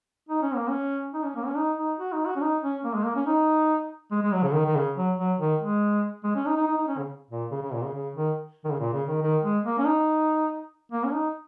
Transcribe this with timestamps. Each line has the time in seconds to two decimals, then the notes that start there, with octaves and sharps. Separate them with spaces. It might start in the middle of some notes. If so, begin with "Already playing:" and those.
0.29 D#4
0.42 C#4
0.55 A#3
0.69 C#4
1.14 D#4
1.24 C#4
1.36 A#3
1.46 C#4
1.56 D#4
1.78 D#4
1.99 F#4
2.12 D#4
2.26 F#4
2.36 C#4
2.41 D#4
2.63 C#4
2.84 A#3
2.95 G#3
3.05 A#3
3.16 C#4
3.27 D#4
4.11 G#3
4.22 G#3
4.33 F#3
4.43 C#3
4.54 D#3
4.65 D#3
4.76 C#3
4.96 F#3
5.18 F#3
5.39 D#3
5.60 G#3
6.24 G#3
6.35 C#4
6.46 D#4
6.56 D#4
6.67 D#4
6.77 D#4
6.88 C#4
6.98 C#3
7.30 A#2
7.52 C#3
7.62 C#3
7.73 A#2
7.84 C#3
7.94 C#3
8.16 D#3
8.65 D#3
8.72 C#3
8.80 A#2
8.93 C#3
9.08 D#3
9.22 D#3
9.43 G#3
9.65 A#3
9.78 C#4
9.85 D#4
10.92 A#3
11.04 C#4
11.13 D#4